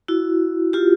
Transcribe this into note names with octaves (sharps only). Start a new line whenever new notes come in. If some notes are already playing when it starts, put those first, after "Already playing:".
E4 F#4
F4 G4